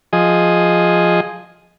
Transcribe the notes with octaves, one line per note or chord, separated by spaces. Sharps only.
F3 G#4 D#5